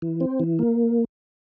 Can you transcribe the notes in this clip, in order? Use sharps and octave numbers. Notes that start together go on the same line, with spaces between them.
E3
C4
E3
A#3